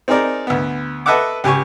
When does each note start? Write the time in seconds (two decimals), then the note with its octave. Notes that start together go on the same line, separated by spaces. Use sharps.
0.08 C4 D#4 G#4 A#4 D5
0.47 D2 B3
1.06 A4 B4 D#5 E5 F#5 D6
1.44 C#2 G4 G#5 C#6